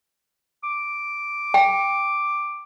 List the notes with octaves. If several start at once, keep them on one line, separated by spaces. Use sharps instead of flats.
D6
G5